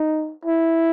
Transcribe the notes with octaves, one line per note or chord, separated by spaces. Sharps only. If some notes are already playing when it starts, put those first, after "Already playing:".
Already playing: D#4
E4